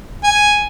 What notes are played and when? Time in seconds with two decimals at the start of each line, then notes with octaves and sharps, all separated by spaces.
0.24 G#5